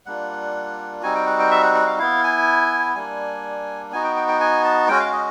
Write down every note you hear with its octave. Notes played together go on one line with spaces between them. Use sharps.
G3 A#3 D4 F4 F#5
G3 C4 D#4 F#4 G#5
G5
F#5
G5
E5
F#5
F#5
F5
B3 E4 F5
G#5
G3 A#3 D4 G#5
B3 D#4 F#4 G#5
G5
G5
G5
G#5
A5
G#3 C#4 F#4 G5
F5
D#5